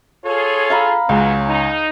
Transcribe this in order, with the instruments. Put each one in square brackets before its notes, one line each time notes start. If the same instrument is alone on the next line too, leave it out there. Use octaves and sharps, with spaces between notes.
[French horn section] F4 G#4 A4 [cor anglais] C#5
[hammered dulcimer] F5 A#5 B5
[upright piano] C#2 [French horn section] B2 F#3 [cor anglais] C#4 [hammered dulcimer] C6
[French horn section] D#4